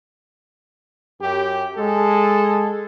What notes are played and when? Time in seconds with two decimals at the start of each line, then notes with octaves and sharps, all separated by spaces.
1.22 F#2 G4
1.77 G#3 A4